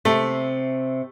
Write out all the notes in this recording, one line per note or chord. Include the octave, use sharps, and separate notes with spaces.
C3 A3